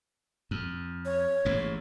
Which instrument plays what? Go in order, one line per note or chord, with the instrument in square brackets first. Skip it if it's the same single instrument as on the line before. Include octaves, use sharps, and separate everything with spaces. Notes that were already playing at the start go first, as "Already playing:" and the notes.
[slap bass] F2
[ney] C#5
[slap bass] A1 D#2 G#2